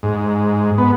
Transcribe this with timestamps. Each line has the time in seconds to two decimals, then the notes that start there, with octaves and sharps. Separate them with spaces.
0.03 G#2
0.78 B3